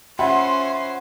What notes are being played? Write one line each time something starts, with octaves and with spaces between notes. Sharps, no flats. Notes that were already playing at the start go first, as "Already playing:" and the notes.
C#4 F4 C5 E5 F#5 B5 C6